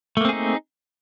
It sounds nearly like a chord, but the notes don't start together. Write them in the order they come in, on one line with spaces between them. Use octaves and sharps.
A3 A#3 C4 G#4 D#4